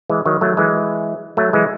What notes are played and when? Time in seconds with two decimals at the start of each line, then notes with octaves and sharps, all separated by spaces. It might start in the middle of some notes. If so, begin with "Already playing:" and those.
0.10 E3 G#3
0.26 D#3 F#3
0.41 F#3 A3
0.57 E3 G#3
1.37 F#3 A3
1.53 E3 G#3